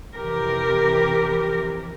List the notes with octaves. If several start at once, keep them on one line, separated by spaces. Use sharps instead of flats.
F2 C3 E3 G4 A#4